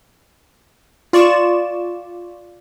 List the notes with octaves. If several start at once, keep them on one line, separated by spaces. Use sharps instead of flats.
F4 D5 C#6 E7